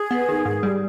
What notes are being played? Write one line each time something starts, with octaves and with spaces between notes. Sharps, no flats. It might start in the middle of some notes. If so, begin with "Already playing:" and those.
Already playing: G#4
B3
D#3
G#2
G3